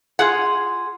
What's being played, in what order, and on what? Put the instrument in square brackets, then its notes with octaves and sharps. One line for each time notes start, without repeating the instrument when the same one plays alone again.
[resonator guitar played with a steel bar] F4 G#4 F#5